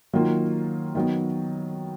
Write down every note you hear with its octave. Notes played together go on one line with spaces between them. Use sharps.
D#3 F#3 A#3 F4
D#3 F#3 B3